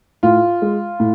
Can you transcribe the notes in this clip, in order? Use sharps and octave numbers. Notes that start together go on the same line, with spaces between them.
A2 F4
G#3
A2